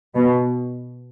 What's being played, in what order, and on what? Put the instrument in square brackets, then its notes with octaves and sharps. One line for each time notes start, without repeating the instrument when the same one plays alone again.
[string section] B2